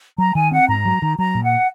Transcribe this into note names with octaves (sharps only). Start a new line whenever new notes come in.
F#3 A#5
D#3 G#5
C4 F#5
G#2 A#5
F#3
D#3
F#3 A#5
A#2
F#5